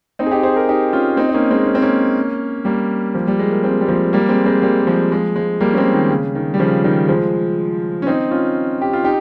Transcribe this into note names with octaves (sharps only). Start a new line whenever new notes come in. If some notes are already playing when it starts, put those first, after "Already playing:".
C4 D#4
G#4
D#4 G4
G#4 C5
G4 A#4
D#4 G4
C#4 F4
C4 D#4
D#4
A#3 C#4
G#3 C4
C#4
C4
A#3 C#4
G3 A#3
F3
G3
G#3
A#3
G#3 C4
G3
F3 G#3
G3 A#3
G#3 C4
G#3 C4
G3 A#3
A#3
F3 G#3
F3 G#3
F3 G#3
G3 A#3
C#4
G#3 C4
D#3
C#3
D#3
G3
C#3 F3
D#3 G3
F3 G#3
C#4
C4 D#4
C#4 F4
G4
F4
D#4 G4